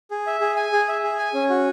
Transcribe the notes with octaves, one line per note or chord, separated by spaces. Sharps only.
G#4
E5
G#4
G#5
G#4
E5
G#4
G#5
C#4
F#4